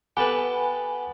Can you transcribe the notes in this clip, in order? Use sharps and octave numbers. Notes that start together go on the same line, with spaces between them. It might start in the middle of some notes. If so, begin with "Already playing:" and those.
B3 G4 A4 B4 G#5